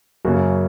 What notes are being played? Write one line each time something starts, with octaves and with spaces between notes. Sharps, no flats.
F#2 C#3 A#3 F#4